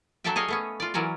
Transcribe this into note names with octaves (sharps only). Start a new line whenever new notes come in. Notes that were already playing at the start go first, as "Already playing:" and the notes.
F#3 D4 A4 D5 E5 G5
G#4 C#5 D#5 F5
A3 B3 C#4
F4 D5
E3 F#3 C#4 A#4 D5